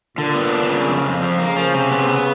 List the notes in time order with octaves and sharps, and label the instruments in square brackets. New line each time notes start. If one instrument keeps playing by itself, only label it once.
[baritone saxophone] A#2 [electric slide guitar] D3
[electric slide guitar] B3
D4
C#3
F2
F2
F3
A#3
[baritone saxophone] C#3
[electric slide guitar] F3
C3
B3
B3